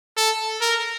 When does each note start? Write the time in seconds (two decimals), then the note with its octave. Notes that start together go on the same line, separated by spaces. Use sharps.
0.17 A4
0.61 A#4